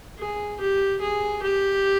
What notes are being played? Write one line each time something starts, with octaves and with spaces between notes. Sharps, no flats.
G#4
G4
G#4
G4